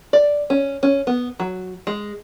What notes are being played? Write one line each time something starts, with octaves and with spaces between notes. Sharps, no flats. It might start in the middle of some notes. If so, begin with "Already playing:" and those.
D5
C#4
C#4
B3
F#3
G#3